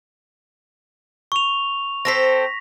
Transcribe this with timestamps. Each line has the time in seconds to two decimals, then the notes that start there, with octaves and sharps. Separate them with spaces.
1.32 C#6 F7
2.05 C4 A4 C5 A#6 B6